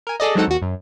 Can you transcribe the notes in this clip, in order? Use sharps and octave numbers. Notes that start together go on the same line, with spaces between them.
A#4 G#5
G#4 A4 D5 D#5
F#3 G#3 C4 D#4 A4 F#5
D#2 F#4
F#2